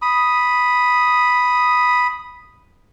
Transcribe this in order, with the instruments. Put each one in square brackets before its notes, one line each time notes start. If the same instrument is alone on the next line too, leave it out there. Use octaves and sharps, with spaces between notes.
[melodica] B5 D#6